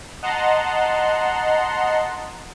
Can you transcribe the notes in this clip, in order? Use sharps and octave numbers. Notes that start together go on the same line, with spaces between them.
D#5 F#5 A5 A#5 C6